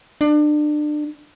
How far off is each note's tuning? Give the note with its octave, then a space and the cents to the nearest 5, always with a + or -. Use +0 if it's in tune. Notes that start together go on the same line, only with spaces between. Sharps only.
D4 +30